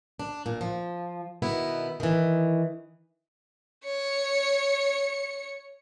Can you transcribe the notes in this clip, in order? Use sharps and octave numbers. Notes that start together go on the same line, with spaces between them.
D4
A#2
F3
B2 D#3 B3 E4
D#3 E3
C#5 C#7